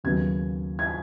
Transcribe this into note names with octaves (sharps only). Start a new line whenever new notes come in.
D#2 C#3 F#3 B3 G#6
G#6